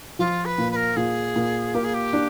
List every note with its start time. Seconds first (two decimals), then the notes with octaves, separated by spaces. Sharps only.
0.19 F3 F4
0.45 B4
0.58 A#2
0.71 B4
0.76 A#4
0.96 A#2 G#4
1.36 A#2
1.74 A#3 G4
1.84 G#4
1.94 G4
2.13 D4